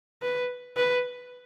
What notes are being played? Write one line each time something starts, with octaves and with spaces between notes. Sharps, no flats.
B4
B4